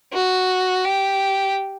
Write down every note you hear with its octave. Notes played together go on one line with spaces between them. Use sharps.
F#4
G4